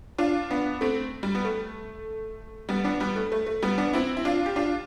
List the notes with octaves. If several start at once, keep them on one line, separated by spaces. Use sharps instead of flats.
D4 F4
B3 D4
A3 C4
G3
B3
A3
G3 B3
B3 D4
G3 B3
A3
A3
A3
G3 B3
B3 D4
C4 E4
E4
D4 F4
G4
D4 F4